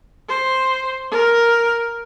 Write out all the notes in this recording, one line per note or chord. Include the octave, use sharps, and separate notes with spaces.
C5
A#4